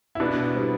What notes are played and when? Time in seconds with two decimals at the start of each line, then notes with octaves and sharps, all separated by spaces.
0.15 E4
0.20 B2 B3 D4
0.54 G3 C4 E4